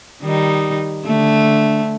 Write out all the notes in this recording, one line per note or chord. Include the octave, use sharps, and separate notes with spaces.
D#3 G3 D#4
D3 A3